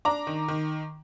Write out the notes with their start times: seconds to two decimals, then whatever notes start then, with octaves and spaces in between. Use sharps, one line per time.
0.05 D4 A#5 D6
0.27 D#3
0.48 D#3